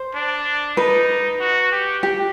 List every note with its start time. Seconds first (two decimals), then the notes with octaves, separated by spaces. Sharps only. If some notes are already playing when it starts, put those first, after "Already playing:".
Already playing: C5
0.15 D4
0.77 D#4 B4
1.40 F#4
1.72 G4
2.03 G4